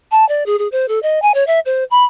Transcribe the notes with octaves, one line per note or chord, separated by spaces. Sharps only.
A5
D5
G#4
G#4
C5
A4
D#5
G#5
C#5
E5
C5
B5